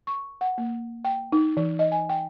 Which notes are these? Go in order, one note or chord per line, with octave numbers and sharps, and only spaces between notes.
C#6
F#5
A#3
G5
D#4
E3
D#5
G#5
G5